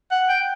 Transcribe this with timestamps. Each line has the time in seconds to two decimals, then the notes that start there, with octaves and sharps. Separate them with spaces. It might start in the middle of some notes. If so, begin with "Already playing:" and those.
0.11 F#5
0.29 G5